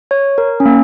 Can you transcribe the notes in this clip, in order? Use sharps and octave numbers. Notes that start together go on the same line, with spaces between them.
C#5
A#4
C#4
A#3